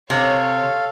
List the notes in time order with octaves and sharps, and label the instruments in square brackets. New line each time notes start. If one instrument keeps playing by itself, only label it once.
[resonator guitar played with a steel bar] C3 [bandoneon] A4 F5 [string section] C#5